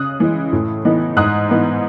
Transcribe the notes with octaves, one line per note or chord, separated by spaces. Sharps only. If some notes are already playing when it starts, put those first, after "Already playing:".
Already playing: C#3 D#6 F#6
E3 G#3
A2
E3 B3 D#4
G#2 D#6 F#6
E3 B3 D#4